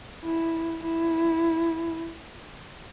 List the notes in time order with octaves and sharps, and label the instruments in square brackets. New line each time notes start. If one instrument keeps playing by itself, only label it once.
[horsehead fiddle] E4
E4